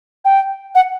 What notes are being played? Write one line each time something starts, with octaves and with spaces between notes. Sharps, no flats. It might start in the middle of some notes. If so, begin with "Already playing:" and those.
G5
F#5